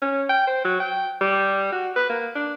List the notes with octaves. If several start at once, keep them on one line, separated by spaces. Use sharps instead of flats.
C#4
G5
C5
F#3
G5
G3
F#4
B4
A#3
D4